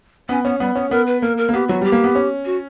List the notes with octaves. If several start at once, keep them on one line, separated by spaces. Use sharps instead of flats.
B3 C#4
B3 C#4
G3 B3
B3 C#4
B3 A#4
B4
A#3 A#4
A#4
A#3
B3 G4
F#3 F#4
G3 G4
A#3
B3
C#4
F#4